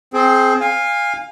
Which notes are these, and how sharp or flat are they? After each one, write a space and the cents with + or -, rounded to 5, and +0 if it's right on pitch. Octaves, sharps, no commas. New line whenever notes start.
C4 +0 G#4 +25
F5 +10 G#5 -25